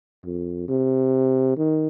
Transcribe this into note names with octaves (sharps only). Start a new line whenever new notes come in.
F2
C3
D#3